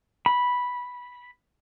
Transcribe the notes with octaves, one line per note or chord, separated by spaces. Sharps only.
B5